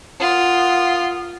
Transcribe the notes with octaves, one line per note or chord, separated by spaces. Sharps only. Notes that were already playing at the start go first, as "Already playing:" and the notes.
F4 A#4 F#5 D#6